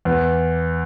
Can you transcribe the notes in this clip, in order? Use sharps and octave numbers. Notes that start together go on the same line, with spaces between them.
E2